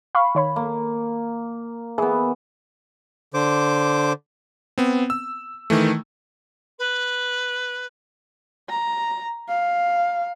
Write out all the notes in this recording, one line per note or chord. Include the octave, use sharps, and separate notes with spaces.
F5 B5 C#6
D#3 C#5 B5
A#3
E3 B3 G#4
D3 C5 D6
B3 C4
E6
D#3 E3 A3
B4
A#5
F5